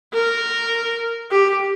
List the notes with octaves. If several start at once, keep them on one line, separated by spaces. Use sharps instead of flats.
A#4
G4